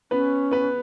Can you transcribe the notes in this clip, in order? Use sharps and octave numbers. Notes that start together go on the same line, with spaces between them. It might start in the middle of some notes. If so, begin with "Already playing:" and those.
B3 C#4 B4
B3 B4